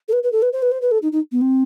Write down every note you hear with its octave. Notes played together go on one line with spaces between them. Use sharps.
A4
B4
B4
A4
B4
C5
B4
C5
B4
A4
D#4
D#4
B3
C4